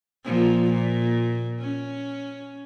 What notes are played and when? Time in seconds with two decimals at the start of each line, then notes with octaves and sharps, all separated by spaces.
0.24 A#2 F3
0.70 A#2
1.60 C#4